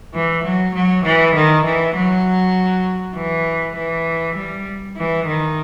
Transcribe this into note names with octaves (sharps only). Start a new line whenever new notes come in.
E3
F#3
F#3
E3
D#3
E3
F#3
E3
E3
G3
E3
D#3